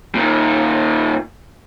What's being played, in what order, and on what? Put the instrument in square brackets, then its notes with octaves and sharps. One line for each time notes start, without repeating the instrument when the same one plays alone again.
[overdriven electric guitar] A#2 D#3